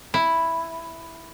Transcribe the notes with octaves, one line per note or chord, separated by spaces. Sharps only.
E4